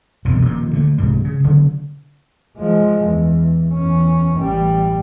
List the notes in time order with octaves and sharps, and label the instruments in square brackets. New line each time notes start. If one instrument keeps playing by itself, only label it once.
[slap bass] E1 C2 F#2 B2
A#2 D#3 F3
D3 A3
C2 G#2 G3
C#3
A1 C#3 F#3 B3
[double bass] F3 G#3
E2
E2 C#4
A1 G3